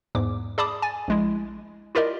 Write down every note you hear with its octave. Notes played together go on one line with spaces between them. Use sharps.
E2 G#2 D6
G#4 D5 A5 B5 D6 D#6
G#5 A6
A#1 G#3 E4
E4 F4 G4 A#4 D5 D#5